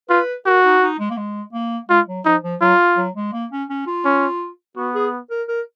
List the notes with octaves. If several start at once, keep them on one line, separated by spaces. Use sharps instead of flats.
F4 B4
F#4 A#4
D#4
D#4
G#3
A#3
G#3
A#3
G#3 F4
F#3
F3 D#4
F3
F#3 F4
F#3
G#3
A#3
C#4
C#4
F4
C#4
B3 F#4
G#4
A#4
A#4